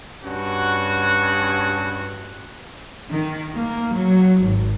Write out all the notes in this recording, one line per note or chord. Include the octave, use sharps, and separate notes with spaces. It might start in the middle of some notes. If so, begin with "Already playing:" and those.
G2 C#4 F#4
D#3
A#3
F#3
G#1